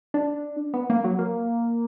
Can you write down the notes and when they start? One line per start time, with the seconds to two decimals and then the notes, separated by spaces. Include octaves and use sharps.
0.14 D4
0.74 B3
0.90 A#3
1.04 F#3
1.19 A#3